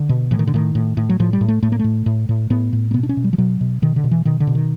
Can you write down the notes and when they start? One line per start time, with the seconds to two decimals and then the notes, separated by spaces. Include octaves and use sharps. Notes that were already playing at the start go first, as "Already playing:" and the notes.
Already playing: D3
0.09 B2
0.31 A2 E3
0.39 D#3
0.47 D3
0.54 A2 D#3
0.75 A2
0.97 A2
1.10 F#3
1.20 A2 F3
1.33 G3
1.41 A2
1.48 A3
1.63 A2 A3
1.72 A#3
1.79 A2 A3
2.06 A2
2.29 A2
2.50 A2 B3
2.73 A2
2.91 A#3
2.94 B2 B3
3.03 D4
3.09 C#4
3.17 B2
3.24 G3
3.33 F3
3.38 B2 F#3
3.61 B2
3.82 B2 D#3
3.96 D3
4.04 B2
4.11 E3
4.25 B2 D#3
4.40 D3
4.47 B2
4.55 D#3